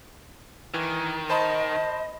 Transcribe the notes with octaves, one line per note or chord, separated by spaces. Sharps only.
D#3 E3
C5 D#5 A5 B5